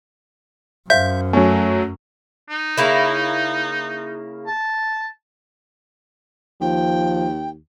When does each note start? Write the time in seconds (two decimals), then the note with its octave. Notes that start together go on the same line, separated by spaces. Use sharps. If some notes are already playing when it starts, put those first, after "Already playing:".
0.90 F#2 C5 E5 F5 G6
1.33 F#3 A3 C#4 G#5
2.50 D#4
2.77 C#3 A#3 E4
4.47 A5
6.61 D#2 F3 G5